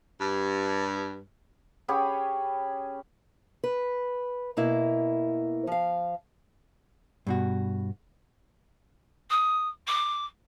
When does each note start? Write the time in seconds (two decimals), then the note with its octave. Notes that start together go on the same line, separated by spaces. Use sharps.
0.20 G2
1.88 C#4 G4 G#4 B5
3.64 B4
4.57 B2 A#3 E4
5.67 F3 F5
7.27 G2 B2 F#4
9.30 D#6
9.87 D6